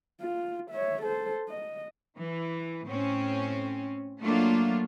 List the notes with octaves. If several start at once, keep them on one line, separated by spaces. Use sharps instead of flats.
F4
C#5 E5
A4 C5
D#5
E3
A2 C4 C#4
F#3 A3 A#3 D4 F4